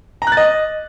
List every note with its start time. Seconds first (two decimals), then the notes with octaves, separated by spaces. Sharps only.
0.22 A#5
0.27 F#6
0.32 A6
0.37 D#5